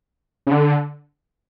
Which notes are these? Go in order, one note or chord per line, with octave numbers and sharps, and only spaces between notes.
C#3
D3